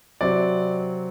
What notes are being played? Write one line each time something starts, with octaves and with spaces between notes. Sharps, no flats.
C3 F#3 C4 D5